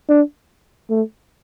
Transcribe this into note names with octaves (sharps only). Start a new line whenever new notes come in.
D4
A3